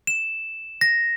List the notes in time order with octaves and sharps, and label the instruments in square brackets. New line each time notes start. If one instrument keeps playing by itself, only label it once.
[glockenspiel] E7
A#6